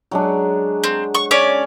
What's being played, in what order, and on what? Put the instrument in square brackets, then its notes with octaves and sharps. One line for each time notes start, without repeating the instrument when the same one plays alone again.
[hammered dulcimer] F#3 G#3 D4
[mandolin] C4
C#6
C#4 C#5 D5